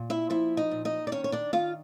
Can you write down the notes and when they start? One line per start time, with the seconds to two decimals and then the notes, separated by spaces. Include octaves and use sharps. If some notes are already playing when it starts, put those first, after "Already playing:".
Already playing: A#2
0.10 E4 E5
0.30 F3 E4 E5
0.57 D#4 D#5
0.71 A#2
0.85 D#4 D#5
1.07 D5
1.12 D#3 C#4 C#5
1.24 C#5
1.32 D4 D5
1.53 D#3 F4 F5